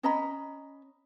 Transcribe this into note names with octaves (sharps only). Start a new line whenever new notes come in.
C#4 D#5 A#5 B5